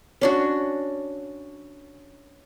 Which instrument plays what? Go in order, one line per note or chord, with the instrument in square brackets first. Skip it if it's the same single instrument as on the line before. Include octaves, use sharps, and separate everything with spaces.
[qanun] C#4 D4 F#4